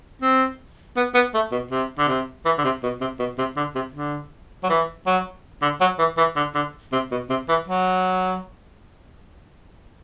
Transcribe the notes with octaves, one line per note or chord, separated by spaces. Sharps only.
C4
B3
B3
A3
B2
C3
D3
C3
E3
D3
C3
B2
C3
B2
C3
D3
C3
D3
F#3
E3
F#3
D3
F#3
E3
E3
D3
D3
C3
B2
C3
E3
F#3